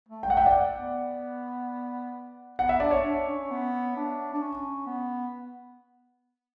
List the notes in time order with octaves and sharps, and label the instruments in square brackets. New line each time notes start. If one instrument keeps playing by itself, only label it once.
[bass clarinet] A3
[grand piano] G5
[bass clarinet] G3
[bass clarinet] A3 [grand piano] F#5
[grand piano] E5 G5
D5 F#5
[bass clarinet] B3
[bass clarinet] B3 [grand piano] F#5
[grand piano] E5
[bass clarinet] D4 [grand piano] D5
[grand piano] C#5 E5
[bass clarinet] D4
C#4
B3
D4
D4
C#4
B3